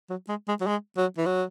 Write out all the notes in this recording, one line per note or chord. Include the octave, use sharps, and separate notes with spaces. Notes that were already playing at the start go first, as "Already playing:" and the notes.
F#3
G#3
G#3
F#3
G#3
F#3
E3
F#3